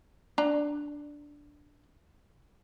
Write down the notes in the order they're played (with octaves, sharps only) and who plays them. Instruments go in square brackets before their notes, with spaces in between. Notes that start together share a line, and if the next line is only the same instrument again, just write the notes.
[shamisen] D4 A#5